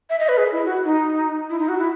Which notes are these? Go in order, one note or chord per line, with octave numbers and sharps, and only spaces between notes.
E5
D#5
B4
G#4
E4
F#4
D#4
E4
D#4
F#4
E4